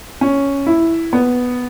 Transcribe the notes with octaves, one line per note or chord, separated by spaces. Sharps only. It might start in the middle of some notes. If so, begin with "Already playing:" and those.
C#4
E4
B3